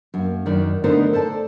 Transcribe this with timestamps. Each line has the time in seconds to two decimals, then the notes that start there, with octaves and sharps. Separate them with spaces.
0.14 F#2 A#3
0.46 F#2 D#3 D5
0.84 D3 A3 B3 D#4 A#4 C5
1.13 A4 C5 D5 A5